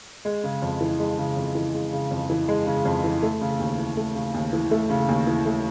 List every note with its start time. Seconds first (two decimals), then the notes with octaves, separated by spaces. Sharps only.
0.25 G#3
0.43 C#3
0.62 F2
0.81 E3
0.99 G#3
1.18 C#3
1.37 F2
1.55 E3
1.74 G#3
1.92 C#3
2.11 F2
2.30 E3
2.48 G#3
2.66 C#3
2.85 F2
3.04 E3
3.22 A3
3.41 C#3
3.59 D#2
3.78 E3
3.97 A3
4.15 C#3
4.34 D#2
4.53 E3
4.71 A3
4.90 C#3
5.08 D#2
5.27 E3
5.45 A3